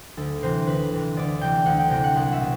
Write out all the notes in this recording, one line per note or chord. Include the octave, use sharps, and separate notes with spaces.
D2 A4
C3 E3 C5
D2 B4
C3 E3
D2 D5
C3 E3 G5
D2 F#5
G5
C3 E3 G5
F#5
C2 F#5
E5
B2